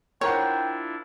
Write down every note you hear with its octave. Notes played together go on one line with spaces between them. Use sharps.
D4 E4 F4 A#4 C5 C#5 F#5 G5